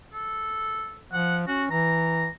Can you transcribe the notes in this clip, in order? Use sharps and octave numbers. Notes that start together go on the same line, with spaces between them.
A4
F3 F#5
C#4 F#4
E3 A#5